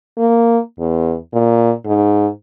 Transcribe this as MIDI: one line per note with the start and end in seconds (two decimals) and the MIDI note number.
0.18 0.59 58
0.79 1.15 40
1.34 1.71 46
1.85 2.27 44